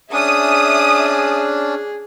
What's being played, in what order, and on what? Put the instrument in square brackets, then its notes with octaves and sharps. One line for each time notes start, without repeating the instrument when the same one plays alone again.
[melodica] C#4 D4 [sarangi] G#4 [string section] E5 D#6